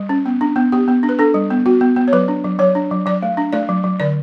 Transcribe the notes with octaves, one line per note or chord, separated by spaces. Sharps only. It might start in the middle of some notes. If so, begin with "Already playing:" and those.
Already playing: G3
C#4
B3
D4
B3
B3 G4
B3
D4
B4
D4 A4
G3
B3
B3 F#4
B3
B3
C#5
F#3 B4
D4
F#3
F#3 C#5
D4
F#3
F#3 D5
A3
D4
A3 D5
F#3
F#3
D3 D5